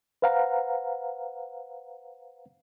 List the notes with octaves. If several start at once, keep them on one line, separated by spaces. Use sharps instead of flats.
B4 C5 F5 F#5 A#5